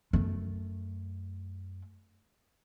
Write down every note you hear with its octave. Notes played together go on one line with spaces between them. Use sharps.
F#2 A3